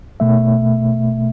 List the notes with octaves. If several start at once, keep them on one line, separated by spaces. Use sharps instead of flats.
B2 A3 E5